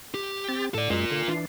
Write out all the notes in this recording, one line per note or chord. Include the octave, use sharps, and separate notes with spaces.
G4
C4 A6
A2 A4 D5
F#2 G#3 F4 A#4
D3
E3 D4